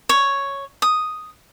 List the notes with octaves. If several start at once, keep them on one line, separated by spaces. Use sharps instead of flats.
C#5
D#6